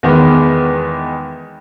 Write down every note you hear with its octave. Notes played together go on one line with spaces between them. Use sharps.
E2 D#3 G#3 B3